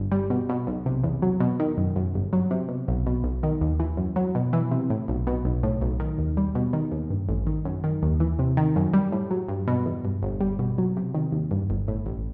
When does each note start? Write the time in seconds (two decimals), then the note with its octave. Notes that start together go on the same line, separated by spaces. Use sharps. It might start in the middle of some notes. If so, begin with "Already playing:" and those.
Already playing: G1
0.12 G3
0.30 B2
0.49 B2
0.67 B1
0.86 C3
1.04 E2
1.22 F#3
1.40 B2
1.60 D#3
1.78 F#2
1.96 F#2
2.14 G1
2.33 F#3
2.51 C3
2.69 B2
2.88 B1
3.06 B2
3.24 B1
3.43 D#3
3.61 D#2
3.80 E3
3.97 F#2
4.16 F#3
4.35 B2
4.53 E3
4.72 C3
4.90 A2
5.08 B1
5.27 B2
5.45 B1
5.63 A2
5.81 B1
6.00 D#3
6.19 D#2
6.37 G3
6.55 B2
6.73 D#3
6.92 D#2
7.10 G2
7.29 A1
7.47 D#3
7.65 F#2
7.84 D#3
8.03 D#2
8.20 E3
8.39 C3
8.57 D#3
8.76 F#2
8.94 G3
9.12 A2
9.31 F#3
9.48 G2
9.68 B2
9.86 E2
10.05 G2
10.22 G1
10.41 G3
10.59 B2
10.78 F#3
10.97 C3
11.15 D#3
11.32 D#2
11.51 G2
11.70 G1
11.88 A2
12.06 A1